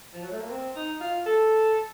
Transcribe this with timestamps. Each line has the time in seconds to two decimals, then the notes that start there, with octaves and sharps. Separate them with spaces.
0.14 F3
0.23 F#3
0.31 A3
0.40 A#3
0.51 C4
0.76 D#4
1.01 F4
1.26 A4